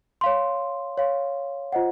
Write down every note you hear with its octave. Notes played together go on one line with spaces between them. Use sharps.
C#5 F5 C6
C#5 F5 C6
F4 C5 D#5 F#5